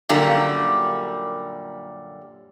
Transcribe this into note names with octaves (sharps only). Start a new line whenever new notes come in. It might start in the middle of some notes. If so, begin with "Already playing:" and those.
F#2 A#2 D3 G3 A#3 G4